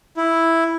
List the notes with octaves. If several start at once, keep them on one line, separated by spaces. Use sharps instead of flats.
E4